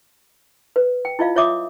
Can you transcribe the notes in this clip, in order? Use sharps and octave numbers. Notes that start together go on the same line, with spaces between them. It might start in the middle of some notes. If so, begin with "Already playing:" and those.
B4
G5
E4 F4 D#5 F5
F4 C#5 E5 D6 D#6